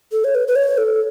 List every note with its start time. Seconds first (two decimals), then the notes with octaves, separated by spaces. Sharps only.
0.12 A4
0.24 C#5
0.35 B4
0.48 B4
0.56 C#5
0.78 A4